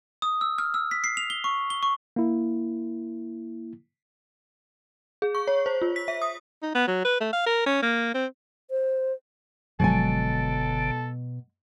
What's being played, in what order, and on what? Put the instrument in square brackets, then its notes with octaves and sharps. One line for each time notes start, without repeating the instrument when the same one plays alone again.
[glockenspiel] D#6
E6
F6
E6
B6
C7
F7
G7
C#6
G7
C#6
[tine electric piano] A#3 E4
[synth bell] G#4
C#6
C#5
C5
F4
B6
E5
D#6
[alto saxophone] D#4
B3
F#3
B4
A3
F5
A#4
C#4
A#3
C4
[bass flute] C5
[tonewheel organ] F#1 D3 [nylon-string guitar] B2 G#5 [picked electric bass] F3 F#3 G#3 [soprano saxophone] A4